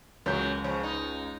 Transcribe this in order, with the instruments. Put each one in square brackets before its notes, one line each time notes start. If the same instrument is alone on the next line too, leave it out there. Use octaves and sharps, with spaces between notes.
[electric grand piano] C#2 G6 [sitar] F#2 E3 F#3
[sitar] C#3 F3
D#4